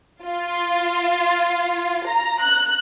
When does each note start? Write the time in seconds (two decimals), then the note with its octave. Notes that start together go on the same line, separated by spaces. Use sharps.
0.23 F4
2.07 A#5
2.41 F#6